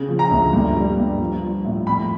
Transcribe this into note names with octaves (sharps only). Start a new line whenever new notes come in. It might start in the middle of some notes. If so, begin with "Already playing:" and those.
Already playing: C#3
F3
A#5
D2
G2
G3
G2
F3
F3
A2
F2 B5